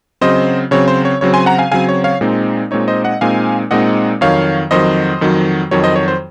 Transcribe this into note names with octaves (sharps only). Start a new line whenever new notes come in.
C#3 F#3 C4 C5 D#5
C#3 F#3 C4 C#5
C5
C#5
C#3 F#3 C4 C#5
G#5 C6
F#5 A#5
F5 G#5
C#3 F#3 C4 F5 G#5
C#5
C#5 F5
A#2 G#3 C4 D#4
A#2 G#3 C4 D#4 C#5
C5 D#5
D#5 F#5
A#2 G#3 C4 D#4 F5 G#5
A#2 G#3 C4 D#4 D#5 F#5
F2 D#3 F#3 C#5 F5
F2 D#3 F#3 C5 D#5
F2 D#3 F#3
F2 D#3 F#3 C#5
C5 D#5
C#5
C5